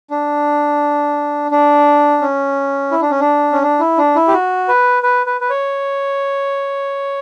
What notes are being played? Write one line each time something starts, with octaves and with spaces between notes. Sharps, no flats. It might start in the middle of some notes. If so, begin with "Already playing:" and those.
D4
D4
C#4
E4
D4
C#4
D4
C#4
D4
E4
D4
E4
G4
F#4
B4
B4
B4
B4
C#5